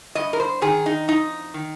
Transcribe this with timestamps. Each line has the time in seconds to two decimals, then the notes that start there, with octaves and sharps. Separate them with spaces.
0.15 G2 D#5
0.33 A#4
0.40 C5
0.62 D#3 G#4
0.86 D#4
1.08 F2 D#4
1.54 D#3